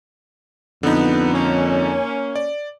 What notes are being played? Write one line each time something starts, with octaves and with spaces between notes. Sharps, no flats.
F2 D3 B3 D#4
A#3 C#4
D5